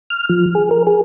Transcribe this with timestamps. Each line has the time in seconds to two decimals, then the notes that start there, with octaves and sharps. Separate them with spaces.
0.10 F6
0.29 F3
0.55 G#4
0.71 A#4
0.87 G#4